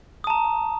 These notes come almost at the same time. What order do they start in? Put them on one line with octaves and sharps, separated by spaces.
D#6 A5 A#5